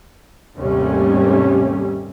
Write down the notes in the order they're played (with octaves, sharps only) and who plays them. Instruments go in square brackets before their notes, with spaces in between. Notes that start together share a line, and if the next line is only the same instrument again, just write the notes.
[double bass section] D#2 G#2 C3 G3 A3 C#4